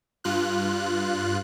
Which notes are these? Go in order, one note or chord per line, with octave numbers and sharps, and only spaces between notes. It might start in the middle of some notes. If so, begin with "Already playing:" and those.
G2 F4 F#6